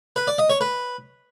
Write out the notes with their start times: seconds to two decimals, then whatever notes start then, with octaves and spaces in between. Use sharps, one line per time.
0.16 B4
0.27 D5
0.38 D#5
0.50 C#5
0.61 B4